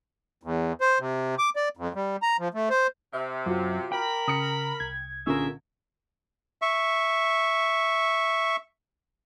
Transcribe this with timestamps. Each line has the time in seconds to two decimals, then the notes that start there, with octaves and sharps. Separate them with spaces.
0.43 E2
0.81 C5
0.99 C3
1.39 D6
1.56 D5
1.77 F2
1.95 G3
2.22 A#5
2.39 F3
2.54 A3
2.70 C5
3.13 C3 E5
3.46 F#2 F4 F#4 D6
3.92 A#4 G5 B5
4.28 C#3 D#6 C#7
4.80 C2 G#6
5.27 A#2 D3 C#4 F4 G#4 A#4 E5
6.62 E5 C#6